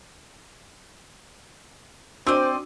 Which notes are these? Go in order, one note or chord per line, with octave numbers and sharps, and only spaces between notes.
C4 D4 F#4 C5 D5 D#5 D6 E6